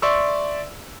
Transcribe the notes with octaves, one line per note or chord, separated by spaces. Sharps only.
D5 E5 C6 C#6 E6